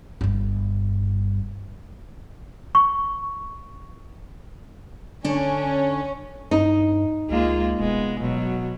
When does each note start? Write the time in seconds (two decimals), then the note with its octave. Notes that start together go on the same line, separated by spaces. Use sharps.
0.21 G1 G2
2.75 C#6
5.24 D3 C#4 D4
6.51 G2 D#4
7.30 C#2 G#3 A#3 F4
7.79 E1 G#3 B3
8.21 E1 B2 F#3